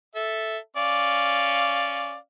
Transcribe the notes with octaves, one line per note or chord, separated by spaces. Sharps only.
A4 E5
C#4 D5 F5